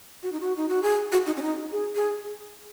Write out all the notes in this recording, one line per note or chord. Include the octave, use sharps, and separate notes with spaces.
F#4
D#4
F#4
D#4
F#4
G#4
F#4
D#4
C#4
D#4
G#4
G#4